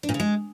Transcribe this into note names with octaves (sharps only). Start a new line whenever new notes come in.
D4
A#2
C#3
G#3